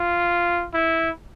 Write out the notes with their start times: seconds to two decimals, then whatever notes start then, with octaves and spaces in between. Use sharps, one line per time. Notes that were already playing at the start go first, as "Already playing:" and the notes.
Already playing: F4
0.74 E4